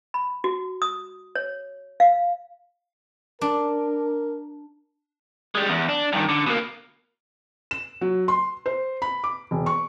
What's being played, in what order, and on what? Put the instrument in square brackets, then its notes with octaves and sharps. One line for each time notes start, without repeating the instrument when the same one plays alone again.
[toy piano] B5
F#4
D#6
C#5
F5
[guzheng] D4 [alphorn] A#4
[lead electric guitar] G3 G#3
E2
D4
G2 D#3
D3
B2 A#3
[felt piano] E7
F#3
C6
C5
B5
D6
E1
C#6